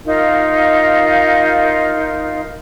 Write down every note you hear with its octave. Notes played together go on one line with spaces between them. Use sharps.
D#4 F4 A#4 F5